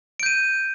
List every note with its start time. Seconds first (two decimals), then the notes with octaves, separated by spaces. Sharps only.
0.20 D7
0.23 G6
0.26 D#7